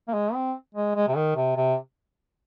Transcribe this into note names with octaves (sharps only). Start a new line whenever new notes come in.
A#3
G#3
C4
G#3
G#3
C3
D#3
C3
C3